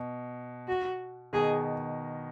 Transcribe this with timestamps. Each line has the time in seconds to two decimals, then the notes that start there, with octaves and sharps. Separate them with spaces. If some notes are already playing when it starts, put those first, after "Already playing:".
Already playing: B2
0.68 F#4
1.33 B2 D#3 G#4